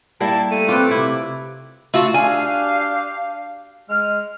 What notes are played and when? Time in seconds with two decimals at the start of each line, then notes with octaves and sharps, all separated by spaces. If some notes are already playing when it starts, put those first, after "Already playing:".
0.20 G3 A#3 E4 A5
0.51 A3 D#7
0.69 C4 F4 B4 D6
0.91 C3 E4
1.94 A3 F4 F#4
2.14 D4 G4 F5 G#5
3.89 G#3 F6